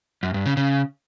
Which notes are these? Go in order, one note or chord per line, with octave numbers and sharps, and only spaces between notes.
F#2
G2
C#3
C#3